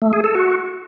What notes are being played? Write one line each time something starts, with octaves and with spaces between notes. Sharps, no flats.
A3
G#4
A4
F#4